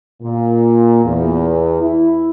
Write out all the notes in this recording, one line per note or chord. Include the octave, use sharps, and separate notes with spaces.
A#2
E2
E4